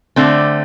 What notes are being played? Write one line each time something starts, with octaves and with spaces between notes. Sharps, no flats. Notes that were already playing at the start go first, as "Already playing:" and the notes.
D3 A3 C4